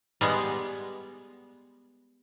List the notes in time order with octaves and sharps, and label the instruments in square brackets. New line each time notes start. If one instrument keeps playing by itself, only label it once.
[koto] G3 G#3 B3